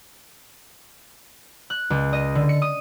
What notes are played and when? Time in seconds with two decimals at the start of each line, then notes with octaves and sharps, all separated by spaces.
1.70 F#6
1.90 C#2
2.13 D#5
2.35 D3
2.49 C#7
2.62 D#6